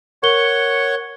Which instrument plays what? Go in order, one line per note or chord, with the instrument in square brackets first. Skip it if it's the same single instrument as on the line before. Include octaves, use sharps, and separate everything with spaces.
[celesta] A#4 G7 [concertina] C#5 F#5 C#6